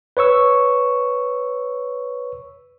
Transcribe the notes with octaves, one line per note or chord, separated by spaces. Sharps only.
B4 C#5 C#6 E6